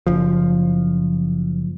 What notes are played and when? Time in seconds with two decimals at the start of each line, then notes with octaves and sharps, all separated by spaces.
0.07 F#1 F3